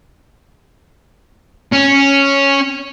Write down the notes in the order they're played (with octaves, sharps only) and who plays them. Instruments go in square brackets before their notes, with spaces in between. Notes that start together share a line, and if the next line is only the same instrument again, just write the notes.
[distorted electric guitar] C#4